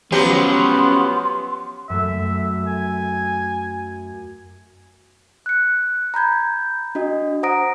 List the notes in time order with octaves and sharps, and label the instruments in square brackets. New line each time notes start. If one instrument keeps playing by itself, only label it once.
[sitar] F3 F#3 G4 [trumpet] B3 [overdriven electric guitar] C#4 B4 [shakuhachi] C6
[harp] F#2 A3 [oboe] E5
[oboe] G#5
[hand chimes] F#6 C#7
A#5 B5 G6 G#6
D4 F#4 D#5
C5 F#5 A#5 D#6 A#6 D7